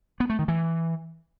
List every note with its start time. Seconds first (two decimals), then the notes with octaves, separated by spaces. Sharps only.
0.20 B3
0.30 A3
0.39 D#3
0.48 E3